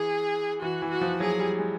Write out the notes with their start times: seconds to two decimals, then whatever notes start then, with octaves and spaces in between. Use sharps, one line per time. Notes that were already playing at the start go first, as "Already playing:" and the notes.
Already playing: E3 G#4
0.62 E3 F#4
0.82 E3
0.91 F#4
1.01 F3
1.20 F#3 G#4
1.39 G3
1.59 G#3